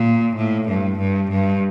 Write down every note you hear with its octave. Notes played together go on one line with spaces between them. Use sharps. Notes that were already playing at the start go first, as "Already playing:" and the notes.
Already playing: A#2
A2
G2
G2
G2